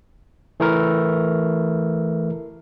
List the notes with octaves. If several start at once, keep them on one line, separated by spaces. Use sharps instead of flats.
E3 A3 E4 A#4